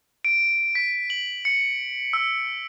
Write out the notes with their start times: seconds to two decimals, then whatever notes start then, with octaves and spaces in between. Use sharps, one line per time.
0.25 D7
0.75 B6
1.10 F#7
1.45 C#7
2.13 E6